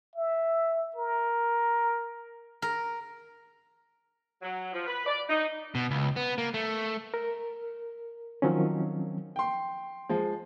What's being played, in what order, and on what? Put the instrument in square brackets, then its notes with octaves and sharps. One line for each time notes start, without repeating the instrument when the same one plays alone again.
[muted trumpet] E5
A#4
[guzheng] A#4
[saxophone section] F#3
F3
B4
D5
D#4
[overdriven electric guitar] B2
C#2
B3
A#3
A3
[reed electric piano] A#4
D#3 F3 F#3 C4 C#4
[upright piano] G5 C6
F3 G#3